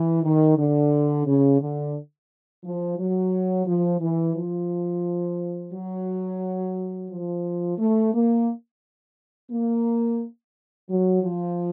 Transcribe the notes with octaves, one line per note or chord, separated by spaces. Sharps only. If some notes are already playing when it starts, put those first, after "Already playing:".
Already playing: E3
D#3
D3
C#3
D3
F3
F#3
F3
E3
F3
F#3
F3
A3
A#3
A#3
F#3
F3